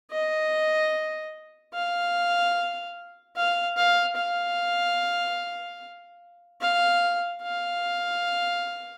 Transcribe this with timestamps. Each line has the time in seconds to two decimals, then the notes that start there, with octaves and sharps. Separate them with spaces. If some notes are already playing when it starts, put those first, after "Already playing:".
0.11 D#5
1.74 F5
3.36 F5
3.77 F5
4.17 F5
6.61 F5
7.42 F5